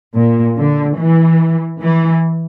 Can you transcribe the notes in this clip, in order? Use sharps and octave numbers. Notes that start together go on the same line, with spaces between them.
A#2
D3
E3
E3